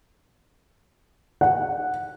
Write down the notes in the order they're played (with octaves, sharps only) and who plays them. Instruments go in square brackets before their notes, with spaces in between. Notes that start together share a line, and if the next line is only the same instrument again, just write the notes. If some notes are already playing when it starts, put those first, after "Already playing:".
[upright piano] F#5